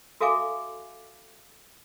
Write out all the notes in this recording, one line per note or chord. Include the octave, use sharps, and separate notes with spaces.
F#4 A4 E5 F5 G#5 D6